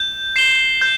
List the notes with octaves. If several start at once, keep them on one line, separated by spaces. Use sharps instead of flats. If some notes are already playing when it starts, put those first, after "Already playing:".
Already playing: G6
C7 E7 G7
G6